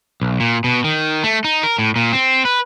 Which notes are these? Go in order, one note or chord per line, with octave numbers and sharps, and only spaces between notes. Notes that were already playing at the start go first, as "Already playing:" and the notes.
B1
A#2
B2
D#3
A3
D#4
A#4
A2
A#2
C4
B4